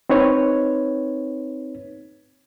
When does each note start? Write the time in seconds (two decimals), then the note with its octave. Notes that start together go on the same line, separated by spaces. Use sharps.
0.09 C4 D#4 B4 C#5